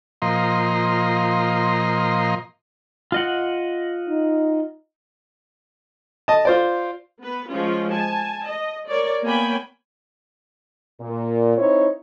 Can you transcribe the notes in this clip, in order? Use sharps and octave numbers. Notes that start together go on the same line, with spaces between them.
A#2 F3 D#5 A#5 C6
F4 D#5 F#5
D#4
D#5 A5
F4 C5 D5
B3 B4
F3 G#3 C#4 F4
G#5 A5
D#5
A#4 C#5 D5
A#3 B3 C#5 G5 G#5 B5
A#2
C4 D#4 E4 C5 C#5